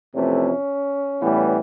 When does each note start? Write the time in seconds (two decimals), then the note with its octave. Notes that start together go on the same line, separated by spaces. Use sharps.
0.14 F2 C3 E3 A3 C#4
1.20 A2 E3 G3 B3